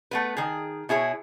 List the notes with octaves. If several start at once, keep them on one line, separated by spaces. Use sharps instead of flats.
A3 B3 B4
D#3 G#4
B2 E4 G#4 C#5